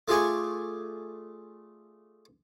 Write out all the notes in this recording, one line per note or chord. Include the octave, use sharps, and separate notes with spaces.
A3 F4 G#4 D5 G#5 C#6